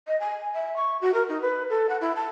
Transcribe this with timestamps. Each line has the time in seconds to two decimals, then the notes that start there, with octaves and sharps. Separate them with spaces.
0.08 D#5
0.20 G#5
0.55 E5
0.76 C#6
1.01 F#4
1.14 A#4
1.29 D#4
1.41 B4
1.70 A4
1.89 F#5
2.01 E4
2.16 A5